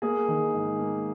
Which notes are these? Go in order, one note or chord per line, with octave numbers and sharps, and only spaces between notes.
A#3 G#4
D#3
G#2
A#3